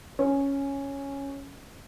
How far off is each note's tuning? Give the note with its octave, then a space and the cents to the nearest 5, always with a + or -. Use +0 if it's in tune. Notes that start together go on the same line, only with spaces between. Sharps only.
C#4 +0